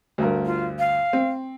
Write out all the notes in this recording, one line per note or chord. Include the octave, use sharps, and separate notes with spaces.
D2 G2 A#4
F4
F5
C4